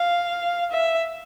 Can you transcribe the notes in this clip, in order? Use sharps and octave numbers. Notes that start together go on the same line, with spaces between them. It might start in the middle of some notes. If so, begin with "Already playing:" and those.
Already playing: F5
E5